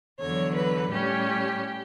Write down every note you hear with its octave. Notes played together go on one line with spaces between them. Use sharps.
E2 D3 F#3 C#5
B4
A2 G3 C#4 G4